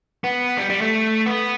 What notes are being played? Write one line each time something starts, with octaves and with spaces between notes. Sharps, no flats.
B3
G3
G3
A3
B3